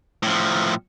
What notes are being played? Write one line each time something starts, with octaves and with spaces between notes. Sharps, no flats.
A2 F3